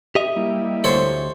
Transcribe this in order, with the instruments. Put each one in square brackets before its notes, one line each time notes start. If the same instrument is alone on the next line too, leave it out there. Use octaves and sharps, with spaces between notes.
[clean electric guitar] G4 D#5 E5
[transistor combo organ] G3 A#3 E4
[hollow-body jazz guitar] D2 C6 [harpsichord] A4 C5 C#5